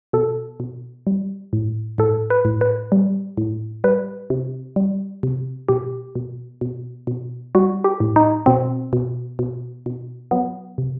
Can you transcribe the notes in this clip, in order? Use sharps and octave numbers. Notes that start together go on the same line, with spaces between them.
B2 A4
B2
G3
A2
A2 A4
B4
A2
B4
G3
A2
G3 B4
C3
G3
C3
B2 G4
B2
B2
B2
G3 F#4
G4
A2
D#4
B2 C4
B2
B2
B2
F#3 B3
C3